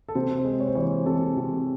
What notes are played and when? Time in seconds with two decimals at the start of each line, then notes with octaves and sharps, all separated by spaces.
0.08 A4
0.15 C3 C5
0.38 C5
0.45 G#3
0.60 C#5
0.67 C5
0.75 E3 C#5
0.84 C5
1.06 C3 A4
1.37 C3